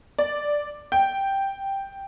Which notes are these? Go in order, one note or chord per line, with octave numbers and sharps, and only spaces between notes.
D5
G5